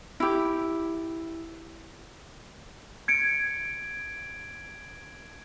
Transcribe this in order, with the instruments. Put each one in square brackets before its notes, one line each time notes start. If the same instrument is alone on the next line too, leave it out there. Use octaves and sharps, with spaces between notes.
[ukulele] E4 G4
[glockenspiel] G#6 C#7 D7